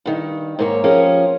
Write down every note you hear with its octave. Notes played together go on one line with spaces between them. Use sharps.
G2 D#3
G#2 A#3 C#5
F3 C#4 G4 G#4 A#4